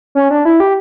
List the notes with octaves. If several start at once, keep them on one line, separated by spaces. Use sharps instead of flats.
C#4
D4
E4
G4